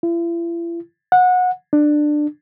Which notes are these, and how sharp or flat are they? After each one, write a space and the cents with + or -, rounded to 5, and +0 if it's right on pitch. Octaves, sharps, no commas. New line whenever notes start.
E4 +45
F#5 -25
D4 +20